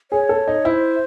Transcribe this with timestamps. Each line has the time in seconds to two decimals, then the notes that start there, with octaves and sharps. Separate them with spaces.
0.11 G#4 C#5
0.29 A4
0.47 D#4
0.65 E4 C5